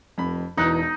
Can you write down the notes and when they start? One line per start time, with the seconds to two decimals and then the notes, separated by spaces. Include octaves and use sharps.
0.18 F1 F2 B5
0.57 E1 E3 D#4 F#6